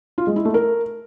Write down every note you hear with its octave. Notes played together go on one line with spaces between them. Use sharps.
F4
G#3
E4
A3
A#4